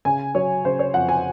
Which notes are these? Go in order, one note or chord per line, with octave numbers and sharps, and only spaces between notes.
C#3 G#5
F#3 C#5
C#3 C5
C#5
F2 F#5
G#5